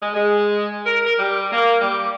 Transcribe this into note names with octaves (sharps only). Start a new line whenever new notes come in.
G#3
G#3
A#4
A#4
G3
A#3
G3